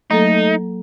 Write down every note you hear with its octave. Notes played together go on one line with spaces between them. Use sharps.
F#3 A3 A#3 D#4 A4